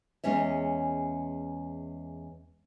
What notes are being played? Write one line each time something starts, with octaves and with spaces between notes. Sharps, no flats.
E2 G#3 C#4 C#5 E5